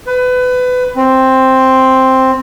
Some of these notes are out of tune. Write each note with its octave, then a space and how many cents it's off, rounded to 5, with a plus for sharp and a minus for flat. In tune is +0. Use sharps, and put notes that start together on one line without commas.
B4 +25
C4 +5